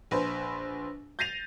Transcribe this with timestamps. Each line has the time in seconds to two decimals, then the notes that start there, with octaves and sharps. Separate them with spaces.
0.11 A#1 B4 C5
1.19 G6 A6 A#6 C7 D#7 F7